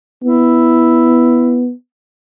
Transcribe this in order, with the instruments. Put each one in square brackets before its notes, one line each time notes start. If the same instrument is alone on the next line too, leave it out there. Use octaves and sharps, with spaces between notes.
[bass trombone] B3 [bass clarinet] E4